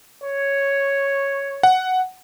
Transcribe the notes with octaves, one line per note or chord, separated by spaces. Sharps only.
C#5
F#5